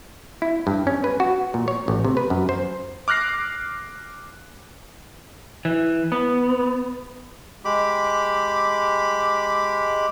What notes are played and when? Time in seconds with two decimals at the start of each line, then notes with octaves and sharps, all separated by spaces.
0.42 E4
0.67 G2
0.87 C#4
1.04 B4
1.20 F#4
1.54 A#2
1.68 C#5
1.88 A1
2.05 C3
2.17 B4
2.30 F#2
2.49 C5
3.08 D6 F6 F#6 A#6 C7
5.65 E3
6.12 B3
7.65 G#3 G4 B5 D6